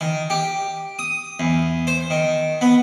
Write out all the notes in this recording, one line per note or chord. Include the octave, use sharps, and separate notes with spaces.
D#3
G4
D#6
E2
C5
D#3
B3